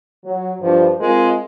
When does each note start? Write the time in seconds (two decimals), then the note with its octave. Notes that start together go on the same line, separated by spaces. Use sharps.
0.25 F#3
0.61 G2 F3
1.00 G#3 C4 F4 A#4